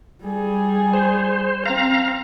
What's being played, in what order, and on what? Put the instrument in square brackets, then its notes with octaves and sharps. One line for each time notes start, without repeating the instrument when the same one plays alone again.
[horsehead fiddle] G3 G#4
[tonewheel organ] C5
[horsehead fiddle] C4 [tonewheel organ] F5 A#5